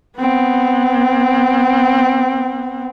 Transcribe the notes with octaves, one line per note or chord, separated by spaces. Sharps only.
B3 C4